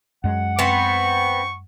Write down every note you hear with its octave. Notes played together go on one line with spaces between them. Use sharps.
F#2 G#3 F#5
B3 C4 C#6